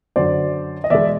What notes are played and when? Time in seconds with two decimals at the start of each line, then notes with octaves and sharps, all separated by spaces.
0.16 F#2 D3 F#3 C5 D5
0.84 D#5
0.90 E2 B2 G#3 D5 E5